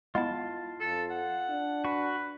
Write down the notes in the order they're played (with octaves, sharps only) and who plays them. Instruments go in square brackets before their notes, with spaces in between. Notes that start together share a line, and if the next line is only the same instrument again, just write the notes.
[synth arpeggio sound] G#3 B3 E4 [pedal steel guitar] F4 A5
[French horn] F2 [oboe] A4
[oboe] F#5
[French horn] D4
[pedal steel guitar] F#4 [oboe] B4